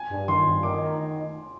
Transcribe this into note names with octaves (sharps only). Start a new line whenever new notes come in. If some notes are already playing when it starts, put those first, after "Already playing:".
Already playing: G#5
G2
D#3 C6
G2
D#3 D6
D#3
D#3